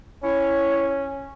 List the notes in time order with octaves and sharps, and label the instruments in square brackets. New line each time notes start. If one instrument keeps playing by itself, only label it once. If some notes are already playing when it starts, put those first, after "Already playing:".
[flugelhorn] C#4 [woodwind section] E4 C#5